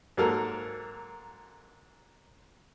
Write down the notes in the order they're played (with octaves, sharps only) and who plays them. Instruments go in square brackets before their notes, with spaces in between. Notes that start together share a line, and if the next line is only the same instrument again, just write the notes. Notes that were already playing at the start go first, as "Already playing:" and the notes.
[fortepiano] G#2 F#3 A#3 A4 A#4